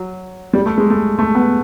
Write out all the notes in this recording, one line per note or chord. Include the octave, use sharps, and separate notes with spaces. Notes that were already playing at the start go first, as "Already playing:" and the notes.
Already playing: F#3
G3
A3
G#3
A3
A3
B3